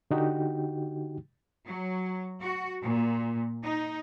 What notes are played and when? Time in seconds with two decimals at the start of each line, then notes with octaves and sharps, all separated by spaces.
0.11 D3 D#4 F#4 G4 G5
1.67 F#3
2.41 F#4
2.83 A#2
3.62 D#4